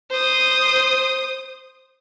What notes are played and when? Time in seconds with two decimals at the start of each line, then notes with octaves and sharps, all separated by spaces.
0.11 C5 D#6